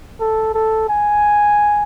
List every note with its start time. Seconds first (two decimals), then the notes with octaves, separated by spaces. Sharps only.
0.20 A4
0.55 A4
0.89 G#5